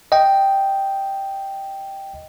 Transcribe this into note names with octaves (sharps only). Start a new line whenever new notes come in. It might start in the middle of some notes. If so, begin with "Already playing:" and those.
D#5 G5